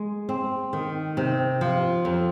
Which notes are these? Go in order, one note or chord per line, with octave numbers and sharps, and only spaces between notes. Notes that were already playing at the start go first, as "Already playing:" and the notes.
Already playing: G#3
C4
D#3
C3
F3
F2